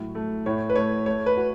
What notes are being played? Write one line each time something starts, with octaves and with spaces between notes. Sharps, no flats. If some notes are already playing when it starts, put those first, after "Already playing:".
Already playing: A2 F#3
A3
A2 C#5
B4
A3 C#5
A3 C#5
B4
F#4